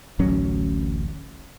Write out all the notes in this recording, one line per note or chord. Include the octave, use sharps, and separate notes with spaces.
D1 A1 F#3 C#4